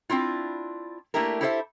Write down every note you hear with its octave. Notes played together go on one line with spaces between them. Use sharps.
C4 D4 E4 F4
A3 A#3 D4 E4 G4 A#4
E4 G4 A4 C5 D#5 E5